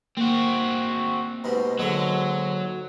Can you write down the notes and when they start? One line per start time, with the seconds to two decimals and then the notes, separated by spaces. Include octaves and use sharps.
0.17 A#3 C4 F#4
1.44 G#2 B2 G3
1.79 G#2 D3 F#3